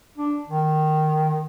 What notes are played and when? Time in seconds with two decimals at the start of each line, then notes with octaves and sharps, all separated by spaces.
0.18 D4
0.47 D#3